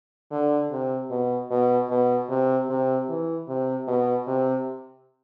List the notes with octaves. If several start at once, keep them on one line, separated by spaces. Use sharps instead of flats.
D3
C3
B2
B2
B2
C3
C3
E3
C3
B2
C3